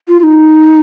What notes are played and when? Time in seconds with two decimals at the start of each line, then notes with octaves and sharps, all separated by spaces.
0.08 F4
0.20 F4
0.23 D#4